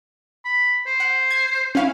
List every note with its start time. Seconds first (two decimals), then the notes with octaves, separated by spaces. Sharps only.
0.45 B5
0.87 C5
1.00 F#5
1.31 G#6
1.75 C#4 E4 F5